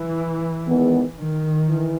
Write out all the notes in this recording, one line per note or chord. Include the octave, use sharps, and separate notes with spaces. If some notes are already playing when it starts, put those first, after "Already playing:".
Already playing: E3
E2 D#3 G#3 B3
D#3
E3